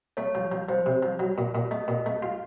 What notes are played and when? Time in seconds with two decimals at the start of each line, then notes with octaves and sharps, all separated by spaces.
0.17 A3 C#5
0.35 F3
0.52 F3
0.69 F3 C5
0.86 C3
1.03 F3
1.19 F#3
1.38 A#2
1.55 A#2
1.71 A3 D#5
1.88 A#2
2.06 A3
2.22 F4